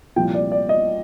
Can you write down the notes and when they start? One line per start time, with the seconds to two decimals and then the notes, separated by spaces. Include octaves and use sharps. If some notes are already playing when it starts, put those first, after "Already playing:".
0.16 C2 A#2 F3 G5
0.34 D5
0.52 D5
0.69 D#5